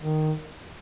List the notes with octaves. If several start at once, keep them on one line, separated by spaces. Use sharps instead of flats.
D#3